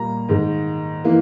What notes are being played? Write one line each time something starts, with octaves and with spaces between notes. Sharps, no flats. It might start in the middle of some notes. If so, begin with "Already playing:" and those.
Already playing: A#2 G3 A#3 A#5
G#2 D#3 G#3
E3 A#3